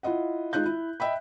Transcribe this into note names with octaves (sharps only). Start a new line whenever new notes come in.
E4 F4 D#5 F#5
G#3 D#4 F4 F#6 G6
E4
D#5 E5 G5 B5